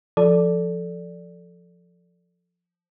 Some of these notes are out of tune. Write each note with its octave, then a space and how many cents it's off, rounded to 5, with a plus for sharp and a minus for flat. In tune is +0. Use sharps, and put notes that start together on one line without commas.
F3 +5 A4 +0 D5 -5